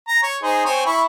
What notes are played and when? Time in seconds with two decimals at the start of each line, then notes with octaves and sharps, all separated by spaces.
0.08 A#5
0.23 C#5
0.43 D#4 G#4 C5
0.65 C4 C#5 G#5
0.86 E4 B5 C#6